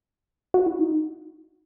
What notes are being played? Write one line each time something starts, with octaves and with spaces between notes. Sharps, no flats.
F#4
E4
D#4